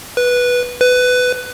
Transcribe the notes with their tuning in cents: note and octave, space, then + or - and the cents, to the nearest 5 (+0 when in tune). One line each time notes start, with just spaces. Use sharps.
B4 -10
B4 +15